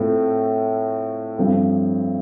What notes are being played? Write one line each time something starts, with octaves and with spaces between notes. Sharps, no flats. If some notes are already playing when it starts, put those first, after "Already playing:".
Already playing: A2 A3 C4 F4
G2 F3 A3 C4